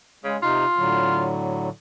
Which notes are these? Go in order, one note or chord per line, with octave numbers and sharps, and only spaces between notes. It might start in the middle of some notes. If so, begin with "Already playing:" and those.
C#3 G#3
C3 D#4 F4
A2 D3 F#3